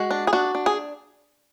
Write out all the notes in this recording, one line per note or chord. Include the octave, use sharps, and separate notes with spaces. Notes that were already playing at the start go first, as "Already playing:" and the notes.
Already playing: G#3 F#4
D4
G#4
D4 F#4
D4
G#4